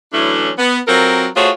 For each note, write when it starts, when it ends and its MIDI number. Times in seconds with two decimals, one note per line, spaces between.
0.13 0.51 52
0.13 0.51 54
0.13 0.51 57
0.13 0.51 61
0.13 0.51 62
0.13 0.51 64
0.58 0.78 59
0.87 1.27 54
0.87 1.27 60
0.87 1.27 65
0.87 1.27 69
0.87 1.27 70
1.35 1.49 57
1.35 1.49 65
1.35 1.49 66
1.35 1.49 68
1.35 1.49 72
1.35 1.49 73